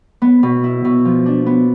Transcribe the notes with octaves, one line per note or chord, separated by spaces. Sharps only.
B3
B2
E4
B2
F3
D4
B3